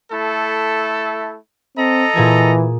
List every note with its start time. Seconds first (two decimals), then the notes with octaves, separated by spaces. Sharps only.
0.12 A3 E4 A4
1.77 C4 A4 D#5 A#5
2.16 A#2 E3 G#4 G#6